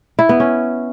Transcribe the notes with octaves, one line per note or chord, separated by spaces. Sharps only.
E4
B3
C#4